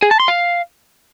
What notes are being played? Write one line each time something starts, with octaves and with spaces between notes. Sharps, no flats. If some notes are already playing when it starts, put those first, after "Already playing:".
G#4
A5
C6
F5